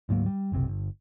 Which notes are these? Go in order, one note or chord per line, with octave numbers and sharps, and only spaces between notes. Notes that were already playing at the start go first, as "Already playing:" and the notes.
D2 G#2 F#3 A#3
G3
F#1 B1 C3
G1